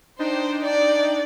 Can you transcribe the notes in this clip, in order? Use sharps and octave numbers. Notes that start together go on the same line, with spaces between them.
D4 D#4 C5 G5
D5